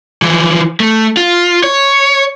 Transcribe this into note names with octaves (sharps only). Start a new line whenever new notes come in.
E3 F3
A3
F4
C#5